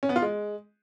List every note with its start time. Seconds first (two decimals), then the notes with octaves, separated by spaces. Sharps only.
0.03 C#4
0.09 B3
0.16 F4
0.22 G#3